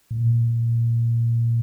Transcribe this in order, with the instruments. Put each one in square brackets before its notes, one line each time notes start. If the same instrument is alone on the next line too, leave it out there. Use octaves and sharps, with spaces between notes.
[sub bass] A#2